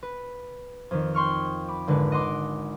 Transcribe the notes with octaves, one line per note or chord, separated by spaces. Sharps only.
B4
F2 D#3
G5 C6 C#6 F6
B5 D6
G#1 D3 G#3 B4
D#5 F#5 C6 D6